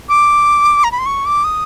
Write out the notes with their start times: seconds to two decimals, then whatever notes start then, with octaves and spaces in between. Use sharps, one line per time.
0.09 D6
0.84 A#5
0.92 B5
0.99 C6
1.06 C#6
1.26 D6
1.44 D#6